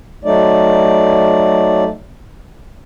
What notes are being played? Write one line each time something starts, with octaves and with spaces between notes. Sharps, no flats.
F#3 A3 D#4 D5